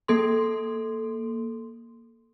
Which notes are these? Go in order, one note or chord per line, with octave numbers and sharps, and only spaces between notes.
A#3 A4 C6